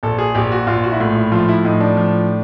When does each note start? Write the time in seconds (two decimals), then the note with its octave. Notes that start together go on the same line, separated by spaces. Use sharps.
0.03 A#1 A4
0.18 G#4
0.35 A#1 G4
0.51 F#4
0.67 A#1 F4
0.84 F#4
0.92 E4
1.00 A2 F4
1.17 E4
1.32 F3 F4
1.49 E4
1.64 A2 D#4
1.80 D4
1.97 F3